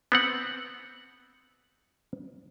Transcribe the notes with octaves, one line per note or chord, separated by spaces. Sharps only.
B3 C4 F#5